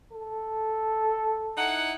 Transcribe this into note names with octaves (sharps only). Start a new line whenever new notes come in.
A4
D#4 E4 F#5